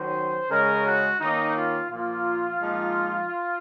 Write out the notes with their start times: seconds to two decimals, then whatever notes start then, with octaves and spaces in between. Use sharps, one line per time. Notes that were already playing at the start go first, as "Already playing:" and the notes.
Already playing: D#3 F#3 C#4 C5
0.51 C#3 G#3 C#4 A#4
0.85 F#4
1.21 D#3 A#3 C#4 D#4
1.56 F4
1.90 A#2 F3 A#3 F4
2.60 A#2 F3 G#3 D#4